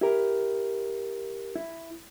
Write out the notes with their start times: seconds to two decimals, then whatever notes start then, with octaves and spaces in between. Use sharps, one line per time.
0.01 E4 G4 A#4
1.56 E4